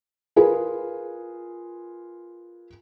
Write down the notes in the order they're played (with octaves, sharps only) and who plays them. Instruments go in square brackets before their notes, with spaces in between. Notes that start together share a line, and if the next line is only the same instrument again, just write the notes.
[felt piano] F4 G#4 A#4 B4